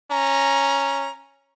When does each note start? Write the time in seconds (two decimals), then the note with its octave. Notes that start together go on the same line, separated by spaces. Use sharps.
0.10 C#4 A#5